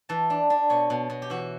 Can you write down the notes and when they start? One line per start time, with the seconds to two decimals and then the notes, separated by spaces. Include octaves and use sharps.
0.09 E3 A5
0.30 D4
0.50 D4
0.70 B2 C#5
0.90 B2
1.10 B2
1.22 G4
1.30 E3 F#4